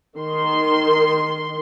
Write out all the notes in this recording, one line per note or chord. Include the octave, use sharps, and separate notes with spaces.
D#3 C6